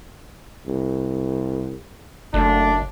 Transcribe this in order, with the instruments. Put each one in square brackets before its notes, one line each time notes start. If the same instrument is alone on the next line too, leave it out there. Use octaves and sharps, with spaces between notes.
[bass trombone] C2
[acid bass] F#1 [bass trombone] A3 [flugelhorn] D4